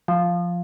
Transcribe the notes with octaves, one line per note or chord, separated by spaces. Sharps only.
F3